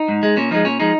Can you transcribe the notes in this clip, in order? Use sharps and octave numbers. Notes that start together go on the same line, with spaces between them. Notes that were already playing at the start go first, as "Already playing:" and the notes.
Already playing: D#4
G#2
G#3
A#2 C#4
F3 G#3 D#4
A#2 C#4
F3 G#3 D#4